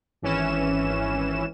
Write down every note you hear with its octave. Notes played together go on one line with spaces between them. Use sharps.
G#1 E3 C#4 E7